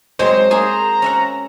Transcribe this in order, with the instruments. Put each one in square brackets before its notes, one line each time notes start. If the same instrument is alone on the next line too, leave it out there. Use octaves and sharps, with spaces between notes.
[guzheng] F#3 G#3 C4 [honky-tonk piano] C5
[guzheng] A#3 G#4 G#5 [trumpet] A#5
[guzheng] C#4 E5 F#5